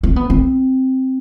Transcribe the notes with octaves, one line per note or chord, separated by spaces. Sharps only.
C4
B3
C4